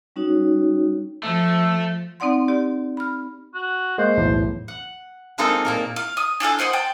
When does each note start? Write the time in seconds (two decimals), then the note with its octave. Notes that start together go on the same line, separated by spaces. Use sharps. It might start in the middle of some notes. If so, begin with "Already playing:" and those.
0.16 G3 C#4 D#4 F#4 C#5
1.23 F3 A3
2.20 C4 D#4 D5 F#5 C6
2.48 G4 D5
2.97 B5 F6
3.54 F#4
3.98 G#3 A#3 C5
4.17 B1 E2 A2
4.68 F#5
5.38 G#3 A#3 C4 D#4 F4 A4
5.65 A#2 A#3 A#4
5.96 F5
6.17 D#6
6.40 D4 F4 G#4 A4
6.59 A#3 C5 F#5 D#6
6.73 G5 A5